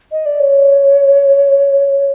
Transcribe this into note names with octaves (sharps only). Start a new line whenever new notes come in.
D#5
D5
C#5